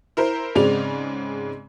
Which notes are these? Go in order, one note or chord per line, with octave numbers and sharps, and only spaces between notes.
E4 A#4 C5
G#2 C#3 G#3 C4 D5 F7